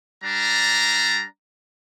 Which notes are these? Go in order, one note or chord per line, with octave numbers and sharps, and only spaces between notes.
G3 D4 A#5